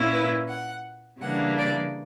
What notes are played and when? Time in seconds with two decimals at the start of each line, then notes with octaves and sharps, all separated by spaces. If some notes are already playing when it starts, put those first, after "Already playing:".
Already playing: A#2 A#3 C#4 E4
0.13 B4
0.48 F#5
1.21 C#3 E3 G3 A#3 D4 F#5
1.57 D5